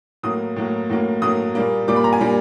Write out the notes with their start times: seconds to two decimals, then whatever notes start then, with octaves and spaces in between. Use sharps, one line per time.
0.23 A2 F#3 A#3 D#6
0.56 A2 F#3 A#3
0.89 A2 F#3 A#3
1.22 A2 F#3 A#3 D#6
1.55 A#2 G3 A#3
1.88 A#2 G3 A#3 D6
1.96 B5
2.04 A#5
2.13 G#5
2.21 A#2 G3 A#3